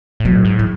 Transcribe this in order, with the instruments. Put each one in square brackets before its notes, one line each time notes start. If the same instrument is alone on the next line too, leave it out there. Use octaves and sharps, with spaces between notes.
[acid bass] A2
[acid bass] B2 [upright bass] F#3
[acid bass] A2
G#2
[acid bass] A2 [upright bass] F#3